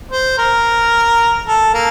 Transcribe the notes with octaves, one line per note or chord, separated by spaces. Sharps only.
C5
A#4
A4
A#3